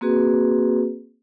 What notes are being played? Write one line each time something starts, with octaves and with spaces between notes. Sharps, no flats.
A#3 C4 F#4 G#4 B4